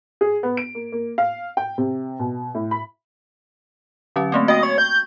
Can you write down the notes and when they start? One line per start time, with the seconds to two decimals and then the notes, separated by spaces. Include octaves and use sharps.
0.21 G#4
0.43 B3
0.57 D7
0.75 A#3
0.92 A#3
1.18 F5
1.57 G5
1.78 C3
2.19 B2
2.55 A2
2.71 B5
4.16 D3 F#3 C#4
4.32 A3 A#3 C4
4.48 F#4 D#5 G5
4.63 C#5 C#6
4.78 G6